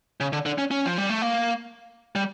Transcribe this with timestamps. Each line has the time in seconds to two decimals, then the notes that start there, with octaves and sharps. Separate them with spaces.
0.20 C#3
0.33 D3
0.46 D3
0.58 C#4
0.71 C#4
0.85 F3
0.98 G3
1.10 A3
1.22 A#3
2.16 G3